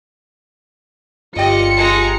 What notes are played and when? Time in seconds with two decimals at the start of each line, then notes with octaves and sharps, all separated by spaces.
1.36 G1 F4 G4 D5 D#5 C#7
1.77 G#3 A#5